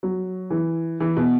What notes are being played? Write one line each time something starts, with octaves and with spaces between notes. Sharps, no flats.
F#3
E3
E3
B2